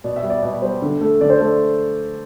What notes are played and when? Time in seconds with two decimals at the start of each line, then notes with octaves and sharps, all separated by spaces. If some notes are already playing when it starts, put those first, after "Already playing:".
0.04 B2 D5
0.16 E5
0.23 G3
0.30 D5
0.42 B2 D5
0.62 G3 C5
0.82 D3
1.01 A3
1.21 D3 D5
1.30 C5
1.40 A3 D5